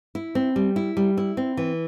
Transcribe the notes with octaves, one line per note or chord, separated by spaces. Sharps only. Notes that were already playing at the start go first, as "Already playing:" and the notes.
E4
C4
G3
E4
G3
E4
C4
E3